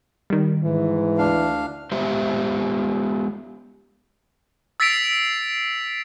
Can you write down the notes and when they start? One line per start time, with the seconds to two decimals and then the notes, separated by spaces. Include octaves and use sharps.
0.30 D#3 G3
0.64 G#2 E3
1.18 D2 D4 F5
1.92 G#3 B3 G4 C5 E5
4.80 E6 A6 B6 C7 D7 F7